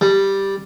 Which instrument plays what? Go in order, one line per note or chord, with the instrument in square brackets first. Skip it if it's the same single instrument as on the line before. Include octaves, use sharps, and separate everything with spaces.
[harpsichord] G3